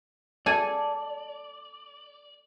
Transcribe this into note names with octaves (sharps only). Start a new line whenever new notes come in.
A4 D5 G#5